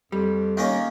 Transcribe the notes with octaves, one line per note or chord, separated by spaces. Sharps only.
F2 G3
D#3 A#3 C#4